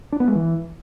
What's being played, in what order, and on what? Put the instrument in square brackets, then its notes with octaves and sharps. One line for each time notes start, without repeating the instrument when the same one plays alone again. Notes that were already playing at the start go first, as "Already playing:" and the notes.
[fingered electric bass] D4
B3
G#3
E3